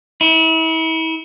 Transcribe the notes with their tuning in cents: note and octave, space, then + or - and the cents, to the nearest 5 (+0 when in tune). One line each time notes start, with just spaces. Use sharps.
E4 -35